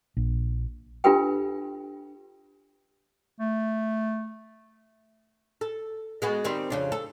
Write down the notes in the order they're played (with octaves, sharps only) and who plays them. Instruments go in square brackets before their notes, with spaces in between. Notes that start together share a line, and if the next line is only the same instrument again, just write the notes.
[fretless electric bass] A#1
[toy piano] D4 F4 G4 A4 B4 G5
[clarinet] A3
[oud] A4
G#3 B3 F#4
D#3 G3 C4
F2 C#3 D4
A4